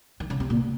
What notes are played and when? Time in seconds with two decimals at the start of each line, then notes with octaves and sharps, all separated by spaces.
0.20 D#3
0.30 C#3
0.40 C3
0.50 A#2